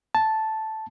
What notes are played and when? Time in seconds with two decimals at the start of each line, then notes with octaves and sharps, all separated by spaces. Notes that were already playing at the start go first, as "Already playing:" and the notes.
0.15 A5